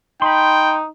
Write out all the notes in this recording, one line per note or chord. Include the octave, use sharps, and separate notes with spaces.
D#4 G5 B5 C6